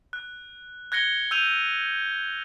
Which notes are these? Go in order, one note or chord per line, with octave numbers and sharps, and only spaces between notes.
F#6
F#6 G#6 A#6 C#7 G7
E6 G6 D#7 F7